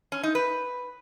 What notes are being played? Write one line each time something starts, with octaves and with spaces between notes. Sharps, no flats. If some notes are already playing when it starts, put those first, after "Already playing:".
C#4
D#4
B4